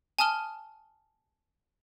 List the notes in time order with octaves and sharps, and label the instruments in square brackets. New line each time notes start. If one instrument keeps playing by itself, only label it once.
[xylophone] G#5 A5 D#6 F6 G7